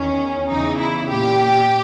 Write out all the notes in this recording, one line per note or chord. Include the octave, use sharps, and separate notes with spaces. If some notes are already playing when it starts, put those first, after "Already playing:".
Already playing: E2 D#3 C#4
E2 C#3 E3 D#4
E4
A#2 G4